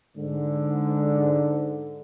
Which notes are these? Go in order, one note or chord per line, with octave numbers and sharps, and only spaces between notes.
G#2 D3